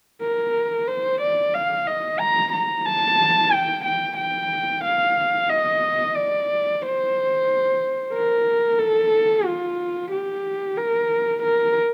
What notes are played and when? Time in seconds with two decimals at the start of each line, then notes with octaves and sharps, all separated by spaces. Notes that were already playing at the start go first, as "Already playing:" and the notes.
0.22 A#4
0.88 C5
1.21 D5
1.54 F5
1.87 D#5
2.20 A#5
2.53 A#5
2.86 A5
3.52 G5
3.85 G5
4.17 G5
4.84 F5
5.49 D#5
6.15 D5
6.82 C5
8.13 A#4
8.79 A4
9.45 F4
10.11 G4
10.77 A#4
11.43 A#4